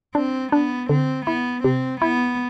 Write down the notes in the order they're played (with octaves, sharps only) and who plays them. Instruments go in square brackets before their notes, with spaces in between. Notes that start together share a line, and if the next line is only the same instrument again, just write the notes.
[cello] C4 [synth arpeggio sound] D4
[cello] B3 [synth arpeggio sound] D4
[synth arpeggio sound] D3 [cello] C4
[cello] B3 [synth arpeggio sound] E4
[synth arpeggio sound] C3 [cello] C4
[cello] B3 [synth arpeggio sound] E4